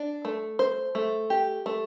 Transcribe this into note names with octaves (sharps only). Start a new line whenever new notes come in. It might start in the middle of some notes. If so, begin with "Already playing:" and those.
Already playing: D4
A3
C5
A3
G4
A3